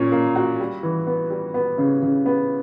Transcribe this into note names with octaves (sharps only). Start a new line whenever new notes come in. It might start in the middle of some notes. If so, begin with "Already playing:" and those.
Already playing: A#2 A#3 C#4
A#3
F#4
G3
E3
B3
G3
B3
C#3
C#3
B3